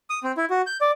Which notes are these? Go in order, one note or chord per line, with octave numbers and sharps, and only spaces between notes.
D#6
C4
E4
F#4
G6
D5